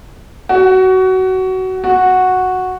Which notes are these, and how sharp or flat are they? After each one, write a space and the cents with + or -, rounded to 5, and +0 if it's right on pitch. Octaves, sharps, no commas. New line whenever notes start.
F#4 +20
F#4 -5